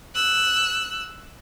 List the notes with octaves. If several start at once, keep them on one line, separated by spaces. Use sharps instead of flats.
E6 F#6